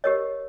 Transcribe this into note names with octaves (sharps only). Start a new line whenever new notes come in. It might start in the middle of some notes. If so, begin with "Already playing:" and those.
G4 A#4 C#5 D#5